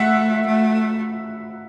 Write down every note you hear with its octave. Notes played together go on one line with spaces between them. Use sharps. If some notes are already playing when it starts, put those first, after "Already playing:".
Already playing: A3 E5 F#5
A3